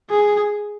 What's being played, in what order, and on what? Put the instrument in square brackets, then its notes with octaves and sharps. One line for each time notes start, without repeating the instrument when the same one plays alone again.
[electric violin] G#4